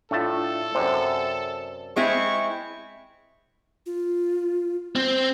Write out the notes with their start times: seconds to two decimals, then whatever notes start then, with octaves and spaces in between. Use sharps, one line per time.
0.11 A2 A3 D4 F4 A4 A5
0.75 F#2 C3 C5 D5
1.96 G#3 C4 E4 C#6
3.86 F4
4.95 C4